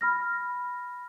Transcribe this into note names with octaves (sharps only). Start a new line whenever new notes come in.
B5 F6 A#6